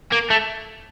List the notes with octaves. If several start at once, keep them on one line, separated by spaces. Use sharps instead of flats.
A#3
A3